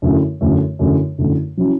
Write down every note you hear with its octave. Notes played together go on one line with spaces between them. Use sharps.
F#2 D3 A3 E4
F#2 D3 A3 E4
F#2 D3 A3 E4
F#2 D3 A3 E4
F#3 C#4 E4